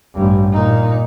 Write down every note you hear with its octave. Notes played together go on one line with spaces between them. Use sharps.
A1 G2
A#2 D#4